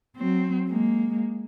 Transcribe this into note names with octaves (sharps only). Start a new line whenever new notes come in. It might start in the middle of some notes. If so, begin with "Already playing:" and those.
F#3 C4
G#3 A#3